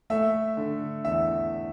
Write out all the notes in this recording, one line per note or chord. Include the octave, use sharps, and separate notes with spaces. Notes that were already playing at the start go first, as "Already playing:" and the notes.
A3 E5
D3
E2 E5